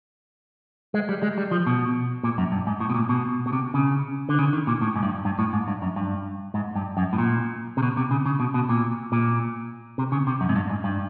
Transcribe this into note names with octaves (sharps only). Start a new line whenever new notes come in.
G#3
G3
G#3
G3
F3
B2
A#2
F#2
G2
G#2
A2
B2
A#2
B2
B2
C3
C#3
D3
C#3
D#3
A#2
A2
G#2
G2
G2
A2
G#2
G2
F#2
G2
G#2
G2
F#2
A2
A#2
C3
B2
C3
C#3
C#3
B2
B2
A#2
A#2
C3
C#3
C3
F#2
G#2
G2
G#2
G2